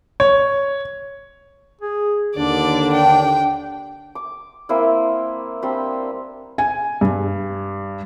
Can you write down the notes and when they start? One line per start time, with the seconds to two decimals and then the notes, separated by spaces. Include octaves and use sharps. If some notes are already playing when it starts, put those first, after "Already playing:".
0.20 C#5
1.81 G#4
2.37 D#2 D3 D4 D5
2.94 G5
4.15 D6
4.69 A#3 C4 E4
5.62 G3 C4 D4 G4
6.58 G#5
7.01 G2